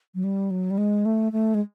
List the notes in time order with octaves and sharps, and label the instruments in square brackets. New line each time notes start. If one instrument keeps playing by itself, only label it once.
[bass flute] F#3
G3
F#3
G3
G#3
A3
A3
G#3